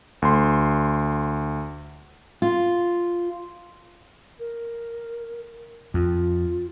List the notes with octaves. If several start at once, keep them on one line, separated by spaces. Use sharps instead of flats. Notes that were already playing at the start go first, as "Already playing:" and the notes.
D2 C6
F4
A#4
F2 F4